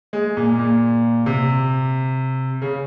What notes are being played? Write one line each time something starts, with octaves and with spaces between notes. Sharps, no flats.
G#3
A#2
A#2
C3
C#3